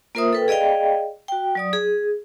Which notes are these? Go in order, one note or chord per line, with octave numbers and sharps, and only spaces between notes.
A#3 F4 A#4 C5 E5 D#6
A4 B4 G5
G#4 D5 D#5 F5 G5
F#4 G5
F#3 D5 D#6
G#4